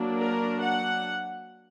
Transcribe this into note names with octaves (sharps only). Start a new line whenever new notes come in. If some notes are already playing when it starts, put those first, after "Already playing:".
Already playing: F#3 A#3 D4
A#4
F#5